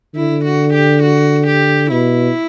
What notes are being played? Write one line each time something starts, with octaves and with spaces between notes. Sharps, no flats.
D3 E4
F#4
G4
F#4
G4
B2 E4